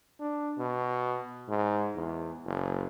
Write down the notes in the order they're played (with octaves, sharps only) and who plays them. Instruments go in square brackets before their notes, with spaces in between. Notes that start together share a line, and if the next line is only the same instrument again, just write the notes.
[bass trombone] D4
B2
G#2
E2
F#1